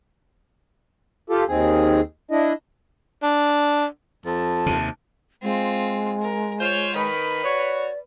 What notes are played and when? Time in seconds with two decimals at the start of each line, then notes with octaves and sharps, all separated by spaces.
1.30 F4 G4 A4
1.48 D#2 D#3 C4 G#4
2.31 D4 E4 D#5
3.23 D4
4.26 F2 A5
4.66 D#2 C3
5.43 G#3 C4 F4
6.22 A#4
6.61 F4 C5 C#5
6.95 D#3 B4 B5
7.44 F#4 C#5 D5